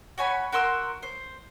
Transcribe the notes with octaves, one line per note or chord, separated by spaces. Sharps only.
F#4 C#5 G#5 B5
F#4 A#4 C6 E6
C5